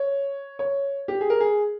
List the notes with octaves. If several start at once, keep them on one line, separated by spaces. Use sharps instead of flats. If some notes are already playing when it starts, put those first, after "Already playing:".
Already playing: C#5
C#5
G4
G#4
A#4
G#4